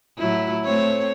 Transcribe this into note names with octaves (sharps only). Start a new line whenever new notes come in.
A2 F#3 E4
A3 C4 C#5